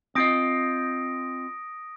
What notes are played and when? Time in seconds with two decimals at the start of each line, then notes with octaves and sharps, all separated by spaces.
0.15 C4 F4 D#5 D#6 A#6 D7